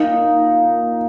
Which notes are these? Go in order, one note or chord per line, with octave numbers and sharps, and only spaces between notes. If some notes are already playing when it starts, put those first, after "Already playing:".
Already playing: A#3 D#4
A#2
F3
A#2
A#3